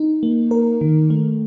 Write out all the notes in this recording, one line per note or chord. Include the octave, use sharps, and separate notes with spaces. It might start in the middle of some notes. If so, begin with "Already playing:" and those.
Already playing: D#4
A#3
A#4
D#3
A3